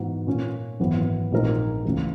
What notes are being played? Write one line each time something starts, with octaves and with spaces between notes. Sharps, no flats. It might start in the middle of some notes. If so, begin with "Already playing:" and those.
Already playing: G#2 E3 B3 F#4
A#2 A#3 C#4
G#1 F#2 E3 B3
A#1 A#2 G#3 D#4 A#4
C#2 C#3 E3